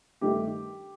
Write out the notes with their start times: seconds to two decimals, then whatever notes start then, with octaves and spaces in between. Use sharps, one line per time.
0.21 G2 D#3 A3 G4